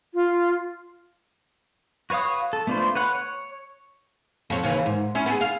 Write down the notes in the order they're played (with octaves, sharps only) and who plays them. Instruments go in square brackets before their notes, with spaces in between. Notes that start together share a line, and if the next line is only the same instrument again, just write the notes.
[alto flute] F4
[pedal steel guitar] F#4 B4 C#5 F5 D#6
A4
A3 B3 D4 F4 C5
B4 C#5 F#5
C#5
[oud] F2 C#5
D#2 C#3 E3
G#2
C#4 E4
B3 G#4
F5